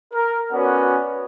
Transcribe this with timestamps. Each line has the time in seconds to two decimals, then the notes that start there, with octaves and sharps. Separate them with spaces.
0.14 A#4
0.53 B3 C#4 F#4 B4 D5 F#5